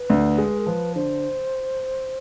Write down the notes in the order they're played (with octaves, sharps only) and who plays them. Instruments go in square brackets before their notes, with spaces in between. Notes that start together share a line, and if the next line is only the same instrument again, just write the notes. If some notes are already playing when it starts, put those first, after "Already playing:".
Already playing: [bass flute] B4
[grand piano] D2
G#3
[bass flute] A#4
[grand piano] F3 [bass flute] B4
[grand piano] D3 [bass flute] C5